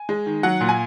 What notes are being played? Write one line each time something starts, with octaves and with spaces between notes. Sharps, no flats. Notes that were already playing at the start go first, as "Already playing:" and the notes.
Already playing: G#5
G#3
D#3
F#3 F#5
A#2
G#5